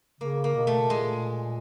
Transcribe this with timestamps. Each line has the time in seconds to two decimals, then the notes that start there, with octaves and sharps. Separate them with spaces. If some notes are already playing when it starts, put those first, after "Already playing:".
0.21 C#3 A#3
0.44 A#3
0.55 B2
0.67 A3
0.90 A#2 G#3